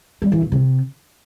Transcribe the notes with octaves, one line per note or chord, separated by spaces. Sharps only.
G3
E3
A#2
C3